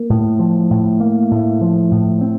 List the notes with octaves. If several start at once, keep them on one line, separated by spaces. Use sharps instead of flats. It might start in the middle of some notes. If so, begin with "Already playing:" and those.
Already playing: A#3
A2
F3
A2
A#3
A2
F3
A2
C4